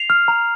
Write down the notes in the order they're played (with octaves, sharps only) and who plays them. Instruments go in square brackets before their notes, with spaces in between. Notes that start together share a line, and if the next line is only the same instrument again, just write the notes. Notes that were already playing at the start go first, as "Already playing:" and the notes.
Already playing: [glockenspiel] C7 F7
F6
A#5